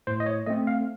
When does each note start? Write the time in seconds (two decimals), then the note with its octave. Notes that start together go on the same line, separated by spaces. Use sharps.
0.07 A2 C5
0.20 D#5
0.26 C#5
0.46 A3 C4 D#5
0.67 F5